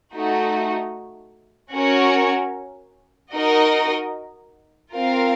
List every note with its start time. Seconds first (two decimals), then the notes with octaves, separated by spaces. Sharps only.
0.15 A3 D#4 F#4
1.74 C#4 F#4 A#4 C#5
3.33 D#4 F#4 A#4 D#5
4.93 C4 F4 A#4 F5